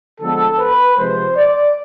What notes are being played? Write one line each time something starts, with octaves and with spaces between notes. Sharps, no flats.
D3 F3 G#3 B3 A4
B4
C3 F3 G#3 C5
D5